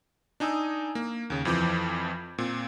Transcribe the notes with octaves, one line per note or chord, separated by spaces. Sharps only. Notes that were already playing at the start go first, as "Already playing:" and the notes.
D4 D#4 G#5 D#6 E6
A#3
D#2 C#3
F2 E3 F3 D6 G6
A#2 C4